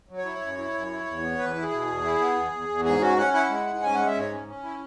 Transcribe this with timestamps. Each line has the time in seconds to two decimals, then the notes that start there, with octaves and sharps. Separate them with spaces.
0.09 F#3
0.18 C#5
0.25 E4
0.41 F#2
0.58 E4
0.74 F#2
0.90 E4
1.07 E2
1.23 B3
1.38 E2 B4
1.56 E4
1.63 G#4
1.71 B2
1.87 E2
2.04 E4
2.20 B3
2.36 E2
2.53 E2
2.69 E2
2.85 G#2 G#4
3.01 C#4 F#4
3.17 C#4 F#5
3.33 E4 F#5
3.49 G#3
3.66 G#2
3.83 C#4 G#5
3.95 G#3 F#5
4.07 E5
4.14 G#2 C#5
4.32 C#4
4.48 C#4
4.63 E4